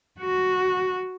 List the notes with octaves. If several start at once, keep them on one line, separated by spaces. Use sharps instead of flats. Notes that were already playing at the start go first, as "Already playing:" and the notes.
F#4